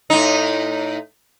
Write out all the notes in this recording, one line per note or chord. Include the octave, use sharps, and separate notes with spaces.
A2 D#4